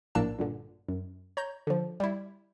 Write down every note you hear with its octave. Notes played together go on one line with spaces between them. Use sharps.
A#1 A2 A#3 D4 A5 E6
G2 A#2 D3
F#2
C#5 A#5 G6
D3 F3
G3 E4